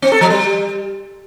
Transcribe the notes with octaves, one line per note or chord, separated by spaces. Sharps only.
C4
A4
F3
G3